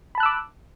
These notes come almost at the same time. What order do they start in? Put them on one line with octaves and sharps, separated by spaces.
B5 A5 F#6 E6 D6